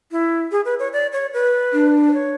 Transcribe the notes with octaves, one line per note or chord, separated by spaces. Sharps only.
E4
G#4
B4
C#5
D5
C#5
B4
D4
B4
C#5